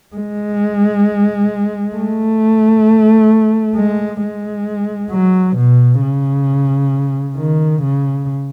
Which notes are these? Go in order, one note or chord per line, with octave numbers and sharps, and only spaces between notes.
G#3
A3
G#3
G#3
F#3
B2
C#3
D#3
C#3